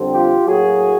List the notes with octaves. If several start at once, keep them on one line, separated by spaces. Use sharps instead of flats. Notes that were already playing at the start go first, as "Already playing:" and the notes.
Already playing: F2 D3 G3 C4
F4 G4
A2 F#3 A#3 F#4 G#4